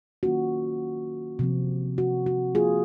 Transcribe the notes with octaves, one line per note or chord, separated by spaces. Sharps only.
D#3 F#3 A#3 C#4 F4 F#4
C3 F3 C4
F#4
F#4
C3 F3 A#3 F4 G#4